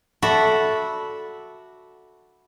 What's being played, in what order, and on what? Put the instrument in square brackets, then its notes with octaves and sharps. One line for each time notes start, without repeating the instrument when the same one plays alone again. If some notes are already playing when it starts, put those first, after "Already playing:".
[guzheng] F#4 A4 D5 E5 B5